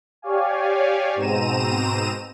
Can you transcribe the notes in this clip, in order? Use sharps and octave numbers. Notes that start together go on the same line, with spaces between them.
G4 C#5 D5 F5 G#5
G#2 B2 C4 A#5 D#7 E7